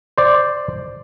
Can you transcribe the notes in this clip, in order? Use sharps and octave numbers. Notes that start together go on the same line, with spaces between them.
C5 D5